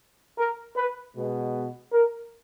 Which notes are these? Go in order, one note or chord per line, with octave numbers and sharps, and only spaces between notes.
A#4
B4
B2 G#3 B3
A#4